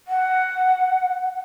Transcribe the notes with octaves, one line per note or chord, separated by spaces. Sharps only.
F#5